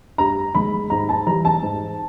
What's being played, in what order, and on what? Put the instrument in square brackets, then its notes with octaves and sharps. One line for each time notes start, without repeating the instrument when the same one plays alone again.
[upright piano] G2 A#5
D#3 G#3 B5
G#2 A#5
A5
E3 G3 A#5
A5
G#2